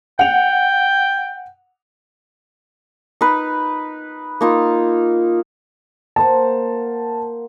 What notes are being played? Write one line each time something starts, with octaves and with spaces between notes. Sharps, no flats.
F#5 G5 F7
D#4 B4
A#3 D#4 F4
A#3 C5 F#5 A5